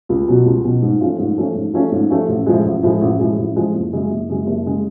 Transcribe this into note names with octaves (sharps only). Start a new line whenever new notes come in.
C#2
B2 F#3
C#2
B2 F#3
G#2
F3 A3 C#4 F4
G#2
F3 A3 C#4 F4
G#2
F3 A3 C#4 F4
G#2
F3 A3 C#4 F4
A1
A2 F3 G#3
A1
A2 F3 G#3
A1
A2 F3 G#3
A1
A2 F3 G#3
F#1
F#2 C#3 G#3
F#1
F#2 C#3 G#3
F#1
C#3 G#3